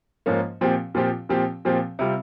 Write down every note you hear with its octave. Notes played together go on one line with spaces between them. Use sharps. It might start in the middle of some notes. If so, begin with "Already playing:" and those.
G#2 F3 A#3 C#4
A#2 F3 C4 G4
A#2 F3 C4 G4
A#2 F3 C4 G4
A#2 F3 C4 G4
C3 G3 C4 F4